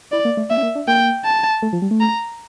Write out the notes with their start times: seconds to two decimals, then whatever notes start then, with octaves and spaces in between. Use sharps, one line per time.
0.12 E4 D5
0.25 A#3
0.37 A3
0.50 A#3 E5
0.58 C#4
0.63 A#3
0.75 D4
0.87 A#3 G5
1.25 A5
1.62 A3
1.73 F3
1.82 G3
1.91 A3
2.00 A#5